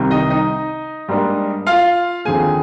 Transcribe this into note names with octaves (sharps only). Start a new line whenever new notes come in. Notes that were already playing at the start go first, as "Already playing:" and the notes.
Already playing: C2 C3 D#3 G3 C4
D#4 D#5
D#4 D#5
G#2 G3 A#3 D4
F4 F5
D#2 D3 F3 C4 D#4 G#4 G#5